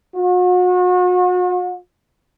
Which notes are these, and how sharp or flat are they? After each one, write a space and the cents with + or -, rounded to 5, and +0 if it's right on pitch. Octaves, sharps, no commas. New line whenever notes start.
F#4 -40